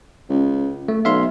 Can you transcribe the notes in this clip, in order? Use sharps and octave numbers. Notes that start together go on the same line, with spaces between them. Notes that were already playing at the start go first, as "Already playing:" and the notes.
C#2
A3
B1 E5 F5 C6